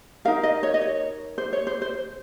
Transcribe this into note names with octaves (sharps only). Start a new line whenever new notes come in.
D#4 A#4 F5
D#5
C#5
D#5
C#5
C5
C#5
C5
C5